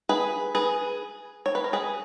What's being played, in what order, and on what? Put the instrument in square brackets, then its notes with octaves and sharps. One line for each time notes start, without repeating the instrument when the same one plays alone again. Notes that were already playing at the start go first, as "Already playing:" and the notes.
[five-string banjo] G#4 B4
G#4 B4
C#5
B4
A#4
G#4 B4